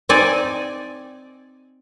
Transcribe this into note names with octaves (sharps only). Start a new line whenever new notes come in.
C4 D#4 D5 G#5